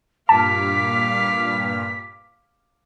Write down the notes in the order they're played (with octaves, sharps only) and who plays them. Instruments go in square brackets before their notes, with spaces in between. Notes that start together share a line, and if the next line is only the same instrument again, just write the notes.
[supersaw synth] G2 A#2 F6 [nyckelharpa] F5 D6 [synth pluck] A5 [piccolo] B6